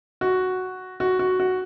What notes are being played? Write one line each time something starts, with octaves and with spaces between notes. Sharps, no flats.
F#4
F#4
F#4
F#4